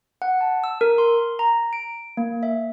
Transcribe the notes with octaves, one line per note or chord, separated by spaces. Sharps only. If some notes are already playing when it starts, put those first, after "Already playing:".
F#5
A5
E6
A#4
C6
A#5
D7
A#3
E5